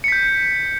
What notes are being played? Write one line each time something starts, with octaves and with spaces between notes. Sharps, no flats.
G6 B6 C#7